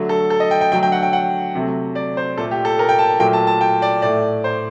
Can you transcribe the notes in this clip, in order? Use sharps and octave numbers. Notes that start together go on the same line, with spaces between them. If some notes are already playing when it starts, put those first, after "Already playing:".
Already playing: D3 F#3 A3
A4
A4
D#5
G5
G5
D3 F#3 A3 G5
G5
F#5
G5
F#5
C3 F#3 A3
D5
C5
A#2 A3 A4
G4
A4
A#4
G5
A5
A#2 F#3 A3 G5
A5
A5
G5
D5
A2 A3 D5
C5